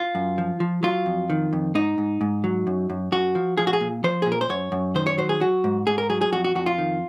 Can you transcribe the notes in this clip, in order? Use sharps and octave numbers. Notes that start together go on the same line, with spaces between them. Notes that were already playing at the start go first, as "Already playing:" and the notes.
Already playing: F4
F#2
F3
F3
F#3 F4
F2
D#3
F2
G#2 D#4
G#2
G#2
F#3
F#2
F#2
F#2 F#4
F3
F3 G#4
F#4
G#4
A#2
F3 C5
A#2 G#4
A#4
C5
F#2 C#5
F#2
D#3 C5
C#5
F#3 C5
G#4
F#3 F#4
G#2
G#2 G#4
A#4
F#3 G#4
G#4
F2 F#4
F#4
F2 F#4
F4
D#3